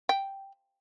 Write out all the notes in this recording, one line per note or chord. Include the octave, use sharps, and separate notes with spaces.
G5